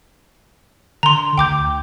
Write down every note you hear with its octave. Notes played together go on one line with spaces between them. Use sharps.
D3 A#5 C6
D2 G5 D6 G6